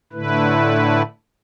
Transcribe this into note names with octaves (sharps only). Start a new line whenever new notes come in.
A2 D3 A3 E4 B4